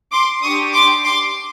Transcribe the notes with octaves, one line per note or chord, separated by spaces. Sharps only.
C6 D6
D4 G4 C#6 D#6
C6 D6
C6 D6